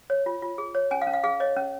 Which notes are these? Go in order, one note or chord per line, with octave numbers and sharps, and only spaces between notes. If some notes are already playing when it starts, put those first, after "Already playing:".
C#5
F4
F4
G#4
C#5
C#4 G#5
F5
C#4
F5
G#4 F5
C#5 D#5
C#4